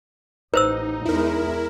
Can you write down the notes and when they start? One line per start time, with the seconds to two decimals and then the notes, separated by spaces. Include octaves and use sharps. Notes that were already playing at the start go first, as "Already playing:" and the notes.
0.54 A1 D#4 B4 C5 E6
1.05 E2 G#3 E4 A#4